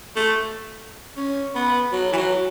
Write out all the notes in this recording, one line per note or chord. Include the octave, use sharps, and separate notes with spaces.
A3
C#4
B3
F#3
E3
F#3